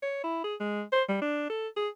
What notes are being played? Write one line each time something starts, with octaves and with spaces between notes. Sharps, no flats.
C#5
E4
G#4
G#3
C5
G3
D4
A4
G#4